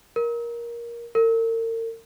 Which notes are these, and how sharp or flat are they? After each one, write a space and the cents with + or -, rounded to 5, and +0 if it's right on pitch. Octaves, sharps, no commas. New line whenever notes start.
A#4 +15
A#4 -40